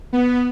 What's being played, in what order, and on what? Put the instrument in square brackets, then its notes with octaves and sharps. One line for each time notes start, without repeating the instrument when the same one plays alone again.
[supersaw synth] B3